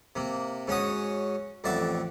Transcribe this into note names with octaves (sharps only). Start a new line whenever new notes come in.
C3 A#3
G#2 C#4 F#4 D#6
A1 F2 D5 E5 F#5 D6